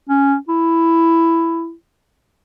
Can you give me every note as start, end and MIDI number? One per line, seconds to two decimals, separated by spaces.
0.09 0.36 61
0.49 1.73 64